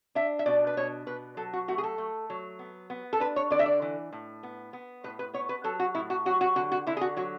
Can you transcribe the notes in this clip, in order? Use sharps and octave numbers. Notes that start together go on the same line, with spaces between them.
D4 E5
E5
B2 D5
B4
B2 C#5
B2 B4
F#3 A4
F#4
A3 F#4
G#4
A4
A3
F#3
B3
B3
A4
D4 B4
C#5
D3 D5
E5
D5
E3
A2
B3
B3
A2 B4
B4
B3 C#5
B4
F#3 A4
F#4
A2 E4
F#4
F#3 F#4
F#4
D3 F#4
F#4
D3 E4
G#4
F#4
F#3 F#4